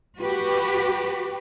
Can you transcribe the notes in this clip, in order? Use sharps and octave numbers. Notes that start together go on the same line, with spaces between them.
F#4 G4 B4